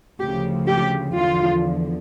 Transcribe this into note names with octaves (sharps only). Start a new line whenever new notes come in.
D2 C#3 F3 G4
G4
E2 D3 F3 F4